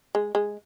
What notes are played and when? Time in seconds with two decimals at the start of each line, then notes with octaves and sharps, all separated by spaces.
0.15 G#3
0.35 G#3